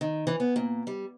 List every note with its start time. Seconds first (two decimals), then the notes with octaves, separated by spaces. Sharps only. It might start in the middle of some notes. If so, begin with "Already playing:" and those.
0.01 D#3
0.27 E3
0.40 B3
0.56 A#2
0.87 G3